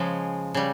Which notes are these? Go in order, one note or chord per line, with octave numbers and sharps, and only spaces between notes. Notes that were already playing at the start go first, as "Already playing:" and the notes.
Already playing: C#3 F3 G#3
C#3 G3